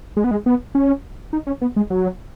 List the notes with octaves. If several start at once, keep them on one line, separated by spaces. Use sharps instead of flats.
G#3
B3
G#3
B3
C#4
D#4
C#4
B3
G#3
F#3